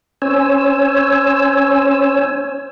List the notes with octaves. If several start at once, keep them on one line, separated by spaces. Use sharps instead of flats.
C#4 C5 C#5 G#5 E6